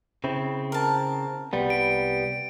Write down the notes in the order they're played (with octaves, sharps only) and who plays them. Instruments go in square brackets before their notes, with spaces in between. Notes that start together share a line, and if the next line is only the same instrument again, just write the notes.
[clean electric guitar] C#3 C4 E4
[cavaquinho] A#4 A5
[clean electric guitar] C2 G3 B3
[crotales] D7